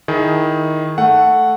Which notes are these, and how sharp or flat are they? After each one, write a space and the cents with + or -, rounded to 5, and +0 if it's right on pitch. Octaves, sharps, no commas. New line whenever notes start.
D#3 +5 E4 +0 G#4 +20
A3 +5 F#5 +0